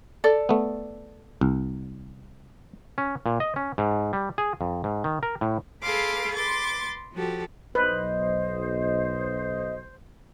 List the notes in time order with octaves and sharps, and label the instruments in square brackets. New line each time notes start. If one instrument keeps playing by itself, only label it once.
[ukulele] A4 D5
[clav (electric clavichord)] A3 B3
C2
C#4
A#2
D#5
C#4
G#2
G3
G#4
F2
G#2
D#3
A#4
A2
[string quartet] G#4 A4 B4 F5 C6 D6
B4 C6 D6 A6
F3 F#4 G4 A4
[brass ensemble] B1 [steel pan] B4 [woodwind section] C5 [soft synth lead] D#5